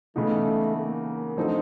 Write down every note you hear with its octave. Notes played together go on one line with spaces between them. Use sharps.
C#3 E3 G#3 A3 B3 D#4
A#3
D3 F3 A3 C4 D#4